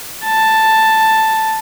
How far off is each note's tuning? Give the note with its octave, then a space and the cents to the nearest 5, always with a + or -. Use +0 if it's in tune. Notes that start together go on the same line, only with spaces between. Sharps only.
A5 +5